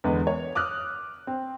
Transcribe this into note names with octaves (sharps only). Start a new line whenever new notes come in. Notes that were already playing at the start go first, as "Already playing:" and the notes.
E2 D3 G#3 B3
C#5
D6 D#6 F6 F#6
C4